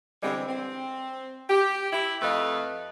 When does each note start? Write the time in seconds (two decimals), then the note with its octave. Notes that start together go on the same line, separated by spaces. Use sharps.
0.23 D3 E3 G3 G#3 C4
0.49 C4
1.50 G4
1.93 E4
2.22 F2 A3 A4 B4 D#5 F5